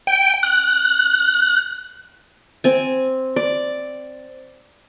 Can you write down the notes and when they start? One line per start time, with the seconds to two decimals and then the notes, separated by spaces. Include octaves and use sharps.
0.07 G5
0.43 F#6
2.64 C4 G#5
3.36 D5